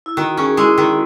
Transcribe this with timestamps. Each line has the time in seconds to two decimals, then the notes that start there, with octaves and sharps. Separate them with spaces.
0.06 E4
0.17 D#3 F#4
0.37 C#4 G#4
0.57 G#3 E4
0.78 D#3